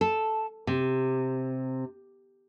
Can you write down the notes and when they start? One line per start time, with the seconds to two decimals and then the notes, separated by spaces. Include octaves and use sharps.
0.01 A4
0.67 C3